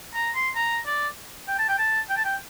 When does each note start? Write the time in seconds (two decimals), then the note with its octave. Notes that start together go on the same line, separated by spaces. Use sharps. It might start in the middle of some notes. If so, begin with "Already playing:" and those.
0.14 A#5
0.35 C6
0.55 A#5
0.86 D5
1.48 G5
1.59 A5
1.68 G5
1.79 A5
2.10 G5
2.17 A5
2.25 G5